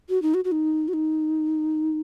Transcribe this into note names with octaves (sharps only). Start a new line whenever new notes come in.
F#4
D#4
F#4
F#4
D#4
F#4
D#4